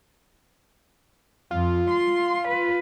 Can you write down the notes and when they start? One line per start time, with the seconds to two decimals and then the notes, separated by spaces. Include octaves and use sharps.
1.51 F2 F4
1.89 C6
2.48 B4